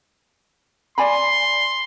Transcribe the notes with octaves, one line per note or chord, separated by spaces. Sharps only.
D5 G#5 B5 C6